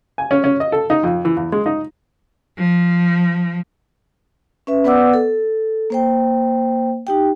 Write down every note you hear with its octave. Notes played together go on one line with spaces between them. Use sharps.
G#5
C#4
C#4
D#5
A4
D#4
F2
E3
E2
G#3
D#4
F3
C#4 B4 E5
B3 B4 D5 F#5 D6 E6
A4
A#3 C5 G5
D#4 G4 G5